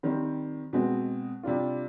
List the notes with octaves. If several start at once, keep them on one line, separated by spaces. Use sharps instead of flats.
D#3 G3 C4
B2 G#3 C4
C3 G3 D4 F4